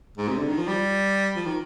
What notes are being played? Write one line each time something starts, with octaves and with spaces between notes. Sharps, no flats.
G#2
C3
D3
D#3
F3
G3
F3
D#3